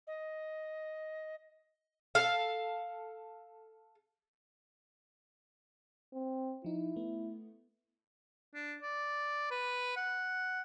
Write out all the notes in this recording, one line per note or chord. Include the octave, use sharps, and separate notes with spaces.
D#5
A4 F5
C4
F3 D#4 E4
A3 B3
D4
D5
B4
F#5